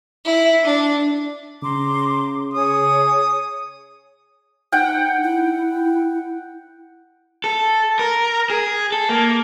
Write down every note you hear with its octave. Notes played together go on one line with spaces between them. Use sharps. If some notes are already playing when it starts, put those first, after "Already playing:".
E4
D4
C#3 A#5 C6 D6
G#4 C#5 D#6
D#4 F#5 G5
E4
A4
A#4
G#4
A4
A#3